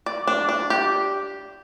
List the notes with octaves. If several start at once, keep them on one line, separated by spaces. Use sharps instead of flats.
D5
D4
D4
G4